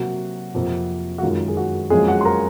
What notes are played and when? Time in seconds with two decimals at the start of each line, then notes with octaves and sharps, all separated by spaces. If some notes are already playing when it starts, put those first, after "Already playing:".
Already playing: C3 F#3 A#3 F#4
0.54 F2 C3 F3 A#3
1.18 F#4
1.22 F#2 D#3 G#3 F4
1.48 G#4
1.57 F#4
1.90 F2 C#3 F#3 G#3 A#3 G#4
2.08 F#4 F#5
2.21 C6
2.25 A#4 A#5